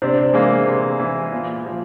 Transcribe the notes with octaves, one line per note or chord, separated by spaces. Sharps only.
C3 C4 D4
E3 G#3 A#3
C3
E3
A#2
F3